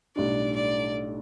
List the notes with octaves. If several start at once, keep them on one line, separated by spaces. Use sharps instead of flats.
B1 A2 G3 D4 D5
D5